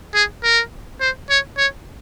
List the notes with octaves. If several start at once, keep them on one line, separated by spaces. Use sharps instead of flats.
G#4
A#4
C5
C#5
C#5